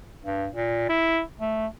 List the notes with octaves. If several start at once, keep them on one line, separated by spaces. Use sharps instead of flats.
G2
A#2
E4
A3